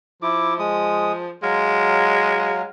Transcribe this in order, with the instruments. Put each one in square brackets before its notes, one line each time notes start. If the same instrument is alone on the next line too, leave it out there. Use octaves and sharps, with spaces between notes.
[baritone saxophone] F3 [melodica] E4 D6
[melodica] G#3 D#6
[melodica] F#3 F5 [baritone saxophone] G#3